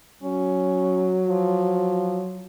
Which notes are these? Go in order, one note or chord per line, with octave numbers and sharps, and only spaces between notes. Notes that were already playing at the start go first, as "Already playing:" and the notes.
F#3 C#4
F3